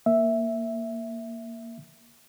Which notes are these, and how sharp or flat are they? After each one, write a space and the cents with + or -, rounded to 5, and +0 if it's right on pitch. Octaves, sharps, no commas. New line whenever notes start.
A#3 +0 E5 +0